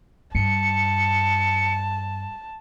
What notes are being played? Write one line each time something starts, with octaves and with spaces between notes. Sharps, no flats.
G2 A5 C#7